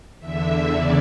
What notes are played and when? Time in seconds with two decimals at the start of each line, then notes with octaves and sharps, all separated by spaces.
0.20 E2 D3 E5
0.70 E2 C#3 E3 D5